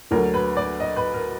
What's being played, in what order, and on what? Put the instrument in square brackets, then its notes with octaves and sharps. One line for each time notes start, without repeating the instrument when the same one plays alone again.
[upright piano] D2 D3 F#3 A#4
B4
D5
D#5
B4
A#4